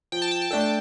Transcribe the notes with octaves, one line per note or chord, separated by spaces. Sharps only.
F3 G5
A5
G5
A5
A3 D4 A4 G5
A5